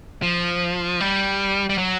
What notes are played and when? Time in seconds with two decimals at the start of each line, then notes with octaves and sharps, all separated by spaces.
0.22 F3
1.00 G3
1.70 G3
1.78 F#3